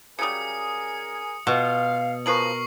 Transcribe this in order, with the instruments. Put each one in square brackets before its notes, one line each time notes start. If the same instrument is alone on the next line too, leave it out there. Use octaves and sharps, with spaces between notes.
[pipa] C#3 F#3 G3 [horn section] G#4 A#4 G#5 [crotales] D#6 C#7
[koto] B2 [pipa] F4 [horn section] F5
[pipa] C#3 F3 B4 [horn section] A#4 [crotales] C#6 C7 F#7